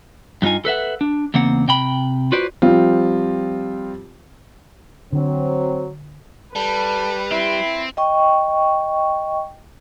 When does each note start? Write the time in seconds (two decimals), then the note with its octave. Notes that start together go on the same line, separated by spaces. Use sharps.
0.42 G2 F#3 D#4 F4 G#5
0.65 A4 B4 E5 F#5
1.01 D4
1.34 E2 C#3 A#3 C4 F#5
1.68 C3 G5 B5
2.32 F4 F#4 B4 C5 D5
2.62 F3 G3 C4 F4
5.13 D3 F#3 C4
6.56 G3 A4 B4
7.31 C4 E4
7.97 D#5 G5 C#6